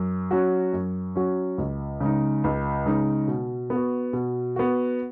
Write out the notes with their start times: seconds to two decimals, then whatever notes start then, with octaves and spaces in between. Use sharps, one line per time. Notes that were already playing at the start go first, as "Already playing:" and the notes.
Already playing: F#2
0.31 F#3 C#4 F#4
0.73 F#2
1.15 F#3 C#4 F#4
1.58 C#2
2.00 C#3 G#3 D#4
2.44 C#2
2.86 C#3 G#3 D#4
3.28 B2
3.70 B3
3.76 F#4
4.13 B2
4.56 B3 F#4